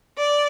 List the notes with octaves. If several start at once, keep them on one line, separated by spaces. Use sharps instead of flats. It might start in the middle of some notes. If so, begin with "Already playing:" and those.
D5